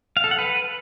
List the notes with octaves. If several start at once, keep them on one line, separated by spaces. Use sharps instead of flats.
F5
A4
F#5
B4